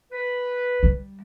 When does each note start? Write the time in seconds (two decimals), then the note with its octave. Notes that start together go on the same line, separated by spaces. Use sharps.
0.11 B4
0.83 G3